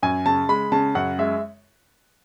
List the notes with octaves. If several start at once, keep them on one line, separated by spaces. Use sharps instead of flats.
F#2 G#5
C#3 A5
G#3 B5
C#3 A5
F#2 F#5
G#3 E5